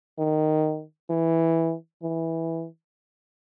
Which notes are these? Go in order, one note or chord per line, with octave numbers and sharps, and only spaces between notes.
D#3
E3
E3